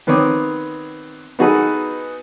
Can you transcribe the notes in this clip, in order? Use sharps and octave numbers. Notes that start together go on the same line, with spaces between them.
D#3 B3 C4 C#5 D6 D#6
B3 D#4 F#4 G#4 A4 B4